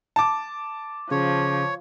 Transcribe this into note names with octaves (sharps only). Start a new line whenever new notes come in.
A5 D6
C#3 F3 C#5